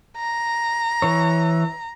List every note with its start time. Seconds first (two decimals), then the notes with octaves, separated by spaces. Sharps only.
0.17 A#5
1.02 E3 C#5